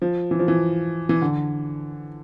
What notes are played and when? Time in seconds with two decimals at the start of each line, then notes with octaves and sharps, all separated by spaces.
0.02 F3
0.31 E3
0.39 F3
0.48 E3
1.09 E3
1.22 D3